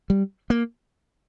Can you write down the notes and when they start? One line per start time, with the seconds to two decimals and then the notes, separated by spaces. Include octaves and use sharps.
0.10 G3
0.50 A#3